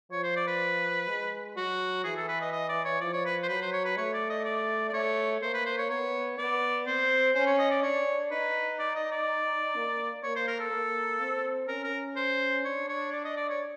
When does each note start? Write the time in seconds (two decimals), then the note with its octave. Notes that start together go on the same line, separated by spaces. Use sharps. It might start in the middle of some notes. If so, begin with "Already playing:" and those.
0.11 F3 C#5
0.23 C5
0.36 D5
0.47 B4
1.08 G#3
1.56 F#3 F#4
2.04 E3 G#4
2.16 A4
2.28 B4
2.41 D#5
2.52 D#5
2.69 D5
2.84 C#5
3.01 F3 D5
3.13 C#5
3.25 B4
3.43 C5
3.49 F#3 B4
3.61 C5
3.73 C#5
3.85 B4
3.97 A3 C#5
4.13 D5
4.29 D#5
4.45 D5
4.89 D5
4.93 A3 C#5
5.42 A#3 C5
5.54 B4
5.65 C5
5.78 C#5
5.90 B3 C#5
6.38 B3 D5
6.86 C4 C5
7.35 C#4 C5
7.46 C#5
7.58 D#5
7.70 D5
7.82 D4 C#5
8.31 D#4 B4
8.79 D5
8.95 D#5
9.11 D5
9.76 A#3
10.23 A#3 C#5
10.36 C5
10.48 A#4
10.59 A4
10.72 A#3
11.20 C4
11.67 C#4 A#4
11.84 A#4
12.16 C5
12.64 D4 C#5
12.88 C#5
13.12 D5
13.24 D#5
13.37 D5
13.49 C#5